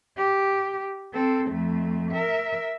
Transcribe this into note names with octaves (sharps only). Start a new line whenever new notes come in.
G4
C4 A4
F2 A3
A#4 E5